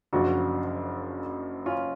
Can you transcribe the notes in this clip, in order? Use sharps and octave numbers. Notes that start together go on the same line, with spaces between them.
F#1 F#2 F3 D4 F#4
C#4 F4